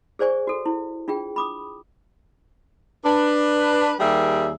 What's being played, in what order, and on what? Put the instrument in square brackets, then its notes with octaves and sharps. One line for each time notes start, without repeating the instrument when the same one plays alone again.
[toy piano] G#4 C5 D5 G#5 C#6
F#4 A4
E4
D4 F4 G#4 G5
B5 D6 D#6
[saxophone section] D4 B4
D#2 G3 A#3 G#4 A#4 E5